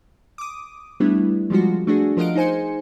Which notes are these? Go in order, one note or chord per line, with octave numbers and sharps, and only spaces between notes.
D6 D#6
G3 A3 B3 D4 E4
F3 G3 G#3 F4 F#4
A3 D4 F#4 G#4
F3 A#4 D#5 F5 F#5 D7
D#4 G#4 C5 G#5 C#7